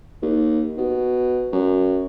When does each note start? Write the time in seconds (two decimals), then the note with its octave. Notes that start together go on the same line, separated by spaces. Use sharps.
0.22 D#2
0.78 B2
1.52 F#2